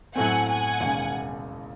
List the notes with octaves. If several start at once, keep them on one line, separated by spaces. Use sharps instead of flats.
A2 F#3 A3 C4 F#5 G#5
F#5 G#5
E1 D#2 C#3